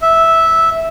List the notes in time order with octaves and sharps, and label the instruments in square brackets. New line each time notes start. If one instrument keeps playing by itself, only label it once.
[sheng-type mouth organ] E5